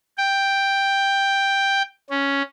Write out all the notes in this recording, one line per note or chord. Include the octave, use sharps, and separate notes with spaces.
G5
C#4